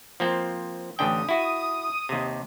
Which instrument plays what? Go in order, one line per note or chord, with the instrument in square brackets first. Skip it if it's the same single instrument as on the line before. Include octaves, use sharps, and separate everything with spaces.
[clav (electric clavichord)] F3 A#3 C4
[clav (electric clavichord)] A1 D3 G5 [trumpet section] D#6
[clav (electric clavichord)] E4 F#4
D#2 C3